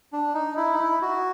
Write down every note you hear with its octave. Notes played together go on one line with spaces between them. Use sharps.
D4
D#4
E4
D#4
E4
F#4